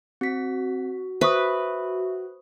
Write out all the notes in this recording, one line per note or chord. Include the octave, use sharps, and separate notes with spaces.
C4 F#4 B6
B4 C5 E5 C#6 D#6